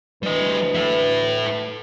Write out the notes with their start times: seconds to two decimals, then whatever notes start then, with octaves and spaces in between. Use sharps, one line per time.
0.23 D2 E3 G3 B4 D#5
0.75 E4 A4